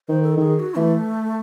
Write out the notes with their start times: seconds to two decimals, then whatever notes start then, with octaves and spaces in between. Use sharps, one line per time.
0.09 D#3 C5
0.23 A4
0.37 D#3 A4
0.41 G#4
0.56 G#4
0.59 F#4
0.76 E3 A3